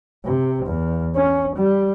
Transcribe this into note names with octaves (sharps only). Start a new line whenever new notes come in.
C3
E2
C#4
G3